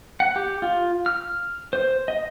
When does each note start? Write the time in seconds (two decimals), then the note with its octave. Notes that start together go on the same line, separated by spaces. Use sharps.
0.20 F#5
0.36 G4
0.62 F4
1.06 F6
1.73 C5
2.08 D#5